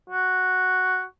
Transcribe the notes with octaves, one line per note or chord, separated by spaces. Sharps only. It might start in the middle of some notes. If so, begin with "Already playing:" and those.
F#4